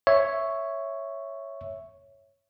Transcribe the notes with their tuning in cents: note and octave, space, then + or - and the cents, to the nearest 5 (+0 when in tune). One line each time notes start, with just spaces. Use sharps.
C#5 +0 E5 +0